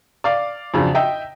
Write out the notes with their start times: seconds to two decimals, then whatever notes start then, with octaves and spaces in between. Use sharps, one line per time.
0.24 D5 F5 D6
0.74 F2 C#3 F#3 D4
0.95 D#5 E5 G5 E6